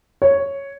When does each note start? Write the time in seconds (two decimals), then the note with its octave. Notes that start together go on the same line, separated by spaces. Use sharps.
0.22 C#5